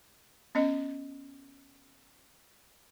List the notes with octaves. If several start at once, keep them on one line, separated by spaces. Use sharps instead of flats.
B3 C#4 D#5